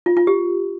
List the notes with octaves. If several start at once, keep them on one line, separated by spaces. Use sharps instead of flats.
F4
F4
G4